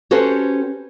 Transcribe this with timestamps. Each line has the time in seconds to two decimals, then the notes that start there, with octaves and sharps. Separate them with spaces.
0.11 C#4 F#4 G4 A4 B4 C5